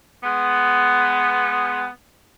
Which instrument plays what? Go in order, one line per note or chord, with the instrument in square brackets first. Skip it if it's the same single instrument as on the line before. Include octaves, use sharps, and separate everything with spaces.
[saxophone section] G#3 B3